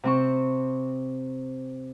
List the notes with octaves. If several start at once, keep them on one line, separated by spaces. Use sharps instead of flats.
C3 C4 C#6